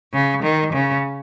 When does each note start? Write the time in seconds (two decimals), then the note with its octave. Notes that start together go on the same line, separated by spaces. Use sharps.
0.13 C#3
0.43 D#3
0.73 C#3